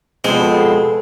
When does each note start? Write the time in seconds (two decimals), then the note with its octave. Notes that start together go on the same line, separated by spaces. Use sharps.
0.24 F2 B2 F3 G#3 C4 A4